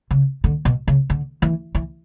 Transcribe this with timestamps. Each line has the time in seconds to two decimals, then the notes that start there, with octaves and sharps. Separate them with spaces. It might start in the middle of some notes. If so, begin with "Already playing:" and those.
0.11 C#3
0.44 D3
0.65 B2
0.88 C#3
1.10 D3
1.42 E3
1.75 E3